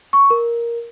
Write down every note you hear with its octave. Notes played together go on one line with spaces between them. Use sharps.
C#6
A#4